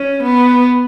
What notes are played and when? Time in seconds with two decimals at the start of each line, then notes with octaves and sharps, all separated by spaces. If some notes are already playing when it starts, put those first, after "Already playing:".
Already playing: C#4
0.23 B3